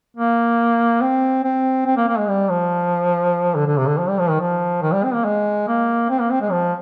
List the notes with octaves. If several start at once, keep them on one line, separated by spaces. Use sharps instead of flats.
A#3
C4
C4
C4
A#3
A#3
G#3
G3
F3
D3
D3
C3
D3
F3
G3
F3
D#3
F3
D#3
G3
C4
A#3
G#3
A#3
C4
A#3
C4
G#3
F3